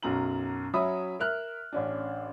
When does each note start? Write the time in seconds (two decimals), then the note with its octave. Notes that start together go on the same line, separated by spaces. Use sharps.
0.03 B1 F#2 F#4 A#5 F#7
0.74 F#3 C#4 E5 B5 D#6
1.19 A#4 E5 F6 F#6
1.73 A1 C#4 D4